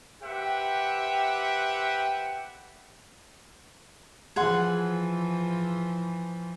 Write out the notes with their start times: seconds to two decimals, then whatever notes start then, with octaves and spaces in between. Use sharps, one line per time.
0.23 G4 B4 C5 E5 F#5 G5
4.36 E3 F3 G#4 F#5 C6